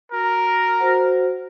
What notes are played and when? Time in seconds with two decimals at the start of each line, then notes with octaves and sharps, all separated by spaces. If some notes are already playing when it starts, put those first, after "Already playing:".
0.12 F#4 A#4
0.79 F#4 C5 F#5